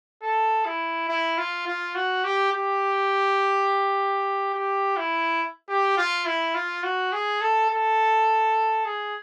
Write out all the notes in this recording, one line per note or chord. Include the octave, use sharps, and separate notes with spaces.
A4
E4
E4
F4
F4
F#4
G4
G4
G4
E4
G4
F4
E4
F4
F#4
G#4
A4
A4
G#4